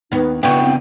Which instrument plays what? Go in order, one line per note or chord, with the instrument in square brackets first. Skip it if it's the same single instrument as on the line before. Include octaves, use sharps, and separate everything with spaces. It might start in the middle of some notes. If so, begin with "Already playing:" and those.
[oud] D#2 B3 [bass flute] D#4
[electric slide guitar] C#3 B3 D4 [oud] E4 F#4 [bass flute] B4 [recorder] G5
[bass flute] C4